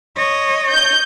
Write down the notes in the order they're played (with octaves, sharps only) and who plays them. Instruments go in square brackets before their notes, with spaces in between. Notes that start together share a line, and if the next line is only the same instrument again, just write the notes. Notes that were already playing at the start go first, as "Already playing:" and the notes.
[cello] C#5 D#5
[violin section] G6